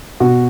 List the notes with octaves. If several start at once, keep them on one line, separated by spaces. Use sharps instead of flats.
B2 F#4